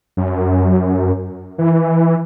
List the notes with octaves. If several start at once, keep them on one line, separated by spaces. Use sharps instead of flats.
F#2
E3